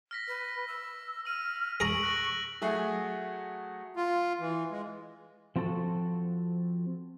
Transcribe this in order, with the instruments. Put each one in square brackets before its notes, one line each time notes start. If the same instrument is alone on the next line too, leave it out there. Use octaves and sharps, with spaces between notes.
[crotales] F6 A#6 B6
[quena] B4
E6
[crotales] E6 D#7 [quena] F6
[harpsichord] G#4 A#5 [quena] C#6 [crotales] D7 F#7
[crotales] F#6 A#6
[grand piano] F#3 A3 F#4 G#4
[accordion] F4
E3
G#3
[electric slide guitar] F3 C4 F#4 A4